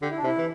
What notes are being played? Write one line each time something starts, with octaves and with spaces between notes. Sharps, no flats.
D3 G4
E4
D4
C3
E4
E3